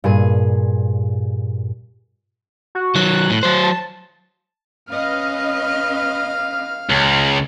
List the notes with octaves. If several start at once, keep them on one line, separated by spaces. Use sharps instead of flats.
G2 A#2 G#4 D#7
F#4
D#3 F#3 F#6
A2
F#3 C5
A5
C#4 B4 D#5 F5 F6
C#2